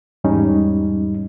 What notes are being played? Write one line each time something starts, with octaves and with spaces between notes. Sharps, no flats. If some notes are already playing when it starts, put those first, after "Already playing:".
E2 G#2 G3 C#4 D#4